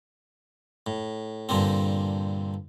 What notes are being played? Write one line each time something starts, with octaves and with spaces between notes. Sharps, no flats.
A2
G2 A#2 D3 C4